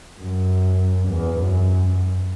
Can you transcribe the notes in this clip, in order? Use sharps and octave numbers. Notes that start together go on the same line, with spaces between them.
F#2
E2
F#2